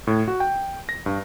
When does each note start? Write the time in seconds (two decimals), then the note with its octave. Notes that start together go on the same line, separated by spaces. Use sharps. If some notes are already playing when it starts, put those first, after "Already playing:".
0.07 A2
0.28 F#4
0.40 G5
0.89 A#6
1.06 G2